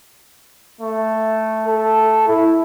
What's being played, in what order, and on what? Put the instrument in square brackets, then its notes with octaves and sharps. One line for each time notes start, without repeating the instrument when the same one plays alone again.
[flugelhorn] A3
[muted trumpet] A4
E4